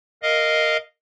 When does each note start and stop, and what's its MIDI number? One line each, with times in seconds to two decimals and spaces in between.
0.23 0.77 70
0.23 0.77 75
0.23 0.77 77